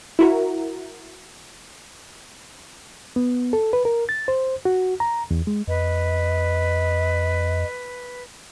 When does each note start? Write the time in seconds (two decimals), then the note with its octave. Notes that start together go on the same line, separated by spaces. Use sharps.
0.19 E4 F#4 A#4
3.16 B3
3.53 A4
3.73 B4
3.85 A#4
4.09 A6
4.28 C5
4.65 F#4
5.00 A#5
5.31 E2
5.47 G#3
5.68 F2 B4 D#5